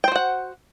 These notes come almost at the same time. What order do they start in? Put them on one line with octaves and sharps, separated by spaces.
G5 C5 F#4 F#5